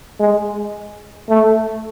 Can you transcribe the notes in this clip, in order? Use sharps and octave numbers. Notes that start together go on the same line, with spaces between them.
G#3
A3